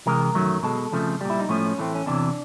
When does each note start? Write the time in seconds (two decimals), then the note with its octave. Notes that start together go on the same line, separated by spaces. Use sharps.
0.06 C3 E3 G#3 A#4
0.35 F#2 D#3 F#3 A3
0.63 B2 G#3 A4
0.92 F2 C#3 F3 A3
1.21 A#2 G3
1.30 E4
1.40 D#4
1.49 A2 F3 A3 C#4
1.78 A2 E3 A3 C4
1.95 C#4
2.06 E2 C3 E3 D4